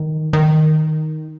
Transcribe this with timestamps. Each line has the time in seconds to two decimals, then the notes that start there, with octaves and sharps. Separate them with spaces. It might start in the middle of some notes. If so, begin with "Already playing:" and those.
Already playing: D#3
0.33 D#3